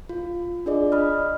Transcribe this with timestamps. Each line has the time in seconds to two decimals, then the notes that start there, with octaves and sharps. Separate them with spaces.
0.09 F4
0.66 D4 F4 G#4 D5 D#5
0.92 D#5 B5 D#6 F6